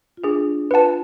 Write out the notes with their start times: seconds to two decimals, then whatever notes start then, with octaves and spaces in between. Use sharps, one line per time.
0.17 F4
0.24 D4 G#4
0.71 F4 B4 F#5 A5